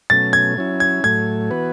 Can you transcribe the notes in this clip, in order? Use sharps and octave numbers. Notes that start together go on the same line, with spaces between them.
B2 F#3 A3 C#4 A6
G#6
F#3 C#4 E4
G#6
A2 F#3 A3 G#6
E3 B3 F#4 B4